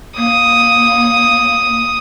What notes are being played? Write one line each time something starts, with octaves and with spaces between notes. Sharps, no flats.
A#3 D#6